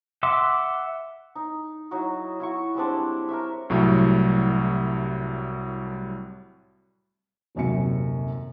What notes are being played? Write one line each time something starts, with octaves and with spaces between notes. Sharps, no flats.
E5 F#5 C6 D6
D#4
F#3 D#4 E4 F#4
E4 F#4 C#6
G3 G#3 C4 D4
A#4 C#5 E5
C2 A2 F#3 G3
D#1 G#1 F#2 C3 C#7